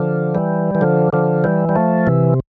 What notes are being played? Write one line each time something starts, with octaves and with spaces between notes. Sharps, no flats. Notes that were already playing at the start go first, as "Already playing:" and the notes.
Already playing: D3 F3
E3 G3
E3
D3 F3
D3 F3
E3 G3
G3
F3 A3
C3 E3